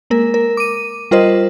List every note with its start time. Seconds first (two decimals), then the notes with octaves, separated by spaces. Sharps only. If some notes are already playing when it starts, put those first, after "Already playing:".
0.10 G#3 A#3 A#4
0.34 A#4
0.57 D6 D#7
1.11 G3 F4 A#4 C5 D#5